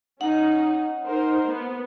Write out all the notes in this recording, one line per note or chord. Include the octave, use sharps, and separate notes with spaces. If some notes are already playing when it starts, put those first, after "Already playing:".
C#4 D#4 F#5
D#4 A#4 C5
B3